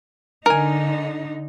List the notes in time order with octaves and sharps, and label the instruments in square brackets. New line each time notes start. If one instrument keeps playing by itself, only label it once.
[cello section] D3 D#4 [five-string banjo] A#4 G#5